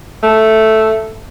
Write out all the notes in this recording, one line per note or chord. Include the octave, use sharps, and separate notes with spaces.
A3